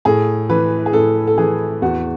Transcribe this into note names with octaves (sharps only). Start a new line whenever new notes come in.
A2 G#4
E3 B4
G#4
A2 A4
A4
E3 G#4
E2 F#4